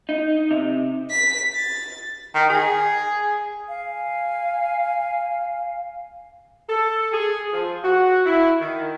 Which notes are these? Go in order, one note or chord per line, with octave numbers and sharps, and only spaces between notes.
D#4
C3
B6
A6
D#3
G#4
F5 G#5
A4
G#4
F3
F#4
E4
D#3